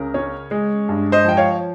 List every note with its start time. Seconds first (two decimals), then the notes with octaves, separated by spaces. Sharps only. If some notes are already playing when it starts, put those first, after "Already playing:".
Already playing: C#2 C#3 A#4
0.14 C#4
0.51 G#3
0.89 G2
1.12 C5 D#5
1.25 F3 G5
1.37 C#5 F5